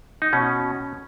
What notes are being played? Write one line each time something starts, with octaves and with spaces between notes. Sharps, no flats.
D#4
B2 C#4